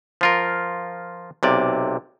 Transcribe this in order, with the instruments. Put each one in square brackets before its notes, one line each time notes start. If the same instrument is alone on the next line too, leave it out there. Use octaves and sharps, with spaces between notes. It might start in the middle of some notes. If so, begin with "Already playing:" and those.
[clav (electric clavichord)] F3 F4 A#4
B1 C3 D5